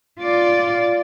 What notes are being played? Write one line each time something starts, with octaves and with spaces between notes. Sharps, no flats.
F4 D5